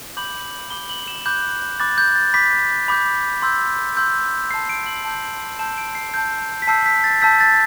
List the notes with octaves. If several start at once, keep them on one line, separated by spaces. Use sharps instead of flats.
B5 D6 G6 F#7
B5 D6 G6 G7
F#7
E7
B5 D6 F#6 G6
B5 D6 F#6 A6
G6
A6
B5 D6 G6 B6
B5 D6 G6
C6 E6 G6
C6 E6 G6
A5 D6 G6 C7
D7
F#7
A5 D6 G6
A5 E6 G6 E7
D7
C7
A5 E6 G6
B6
A5 E6 G6 C7
B6
A6
A5 E6 G6 B6
A6